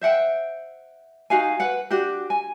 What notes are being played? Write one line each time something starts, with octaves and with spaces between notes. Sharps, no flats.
C5 E5 F#5 G5
D#4 F#4 F5 G#5
B4 F#5
D4 F#4 G4
G#5